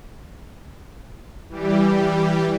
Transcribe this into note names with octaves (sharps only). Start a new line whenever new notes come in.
E3 G3 G4